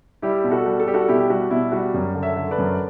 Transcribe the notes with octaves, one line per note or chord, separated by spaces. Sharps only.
G3 E4 G4
B2
F#4 A4
G3
A4
G3 G4
F#4 A4
B2 E4 G4
G4
G3 F#4
B2 E4
G3 F#4
F#2
D3
C#5 E5
D3
B4 D5
F#2
D5